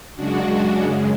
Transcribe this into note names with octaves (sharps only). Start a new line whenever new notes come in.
F#2 C#3 G#3 D4 F#4